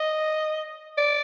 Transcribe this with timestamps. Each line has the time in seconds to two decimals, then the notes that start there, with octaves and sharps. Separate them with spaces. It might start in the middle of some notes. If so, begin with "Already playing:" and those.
Already playing: D#5
0.98 D5